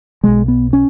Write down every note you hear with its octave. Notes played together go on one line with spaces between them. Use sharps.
B1 B2 G#3
B3
C#4